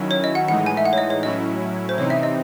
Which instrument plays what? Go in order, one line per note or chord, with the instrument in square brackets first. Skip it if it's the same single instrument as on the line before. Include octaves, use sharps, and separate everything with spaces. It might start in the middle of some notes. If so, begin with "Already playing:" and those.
Already playing: [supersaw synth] D#3 F#3 C#4 E4
[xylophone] C#5
D#5
F#5
[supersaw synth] A2 E3 G#3 D#4 [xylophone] F#5
[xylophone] G#5
E5
F#5
C#5
D#5
C#5
[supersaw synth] A2 F#3 C#4 E4 [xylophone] D#5
[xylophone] C5
[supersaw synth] C3 E3 C4 D#4 [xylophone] C#5
[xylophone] E5
D#5